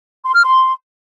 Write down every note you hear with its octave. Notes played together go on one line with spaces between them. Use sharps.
C6
F6
C6